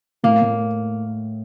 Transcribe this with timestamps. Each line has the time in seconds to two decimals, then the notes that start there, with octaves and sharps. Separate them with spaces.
0.24 A2 A#3
0.42 A2